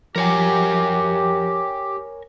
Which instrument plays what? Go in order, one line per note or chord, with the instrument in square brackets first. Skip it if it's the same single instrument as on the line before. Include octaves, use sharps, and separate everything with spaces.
[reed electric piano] F3 [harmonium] G4 [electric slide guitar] A#4 C#5 G#5